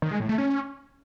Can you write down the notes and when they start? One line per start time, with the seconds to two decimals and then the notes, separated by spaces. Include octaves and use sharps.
0.02 D#3
0.11 G#3
0.20 A2
0.29 A3
0.38 C#4